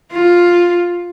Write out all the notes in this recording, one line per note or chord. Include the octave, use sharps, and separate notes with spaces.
F4